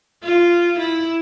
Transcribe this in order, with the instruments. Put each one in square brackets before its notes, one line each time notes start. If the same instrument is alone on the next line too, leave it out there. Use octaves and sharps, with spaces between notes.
[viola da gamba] F4
E4